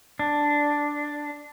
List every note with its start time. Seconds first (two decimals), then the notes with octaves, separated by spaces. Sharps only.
0.19 D4